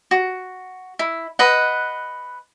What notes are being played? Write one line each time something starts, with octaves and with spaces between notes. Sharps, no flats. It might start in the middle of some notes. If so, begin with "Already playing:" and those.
F#4
E4
B4 D#5 F#5